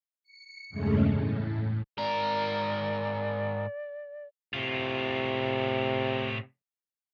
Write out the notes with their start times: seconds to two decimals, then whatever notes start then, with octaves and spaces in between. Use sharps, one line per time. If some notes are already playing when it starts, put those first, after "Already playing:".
0.23 C#7
0.69 E2 G2 C#3 G#3 A3 C#4
1.09 A2
1.98 G#2 A#4 D5
4.54 A2 C3 F4